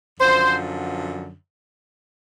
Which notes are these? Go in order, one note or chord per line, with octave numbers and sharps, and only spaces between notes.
F#2 D3 F3 C5